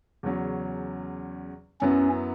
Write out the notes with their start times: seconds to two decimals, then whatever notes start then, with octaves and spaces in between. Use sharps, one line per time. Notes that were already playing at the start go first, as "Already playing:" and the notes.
0.23 E2 C#3 F#3 C#4
1.81 F#2 F#3 B3 C#4 E4